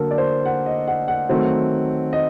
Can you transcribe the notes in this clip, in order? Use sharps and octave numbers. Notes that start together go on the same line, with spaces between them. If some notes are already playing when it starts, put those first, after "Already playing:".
Already playing: D3 F#3 A#3 A4 A#4
D5
C5
F#5
D#5
F#5
F#5
D#3 F#3 A3 C4
D#5